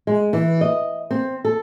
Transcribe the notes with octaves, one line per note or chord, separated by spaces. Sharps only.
G#3
E3
D#5
C4
A4